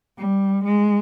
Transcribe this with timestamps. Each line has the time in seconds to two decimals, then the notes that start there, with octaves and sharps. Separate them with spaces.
0.18 G3
0.65 G#3